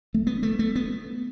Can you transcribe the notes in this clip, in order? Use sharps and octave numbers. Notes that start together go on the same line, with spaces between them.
A3
B3
A3
A3
B3